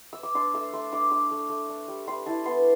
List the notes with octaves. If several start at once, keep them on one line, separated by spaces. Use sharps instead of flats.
E6
D6
D4 C6
A3 E6
A3 C6
D4 D6
D4 D6
A3
A3
D4
G3
G3 C6
E4 A5
B3 C6